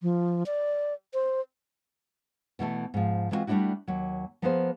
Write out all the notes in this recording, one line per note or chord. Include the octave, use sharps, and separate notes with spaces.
F3
D5
C5
B2 E3 A3 A4
G#2 F3
E3 G#3 B3 C4 F4 F#4
G3 A3 C4 D4 E4 F#4
D#2 F#3
F3 A#3 B3 G#4 B4 C5